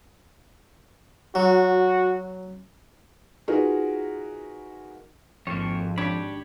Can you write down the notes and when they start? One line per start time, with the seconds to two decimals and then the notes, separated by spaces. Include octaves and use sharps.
1.35 F#3 F#4
3.48 D#4 F4 F#4 G#4 A#4 B4
5.47 G#1 F2 A#3 C#5
5.98 D4 G4 C#5 B5